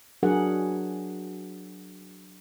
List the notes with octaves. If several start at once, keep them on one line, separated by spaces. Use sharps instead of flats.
F#3 D4 F#4 G#4 A#4 F#5